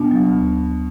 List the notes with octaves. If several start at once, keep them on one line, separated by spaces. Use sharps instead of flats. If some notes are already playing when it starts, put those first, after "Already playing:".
Already playing: B2 D4
F#3
D2